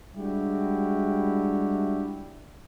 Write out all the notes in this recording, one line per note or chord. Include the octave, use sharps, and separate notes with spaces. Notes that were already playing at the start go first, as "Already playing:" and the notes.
G3 G#3 D4 E4 F#4 G4